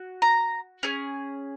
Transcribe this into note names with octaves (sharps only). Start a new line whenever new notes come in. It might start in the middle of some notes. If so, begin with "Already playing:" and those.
Already playing: F#4
A#5
C#4 G#4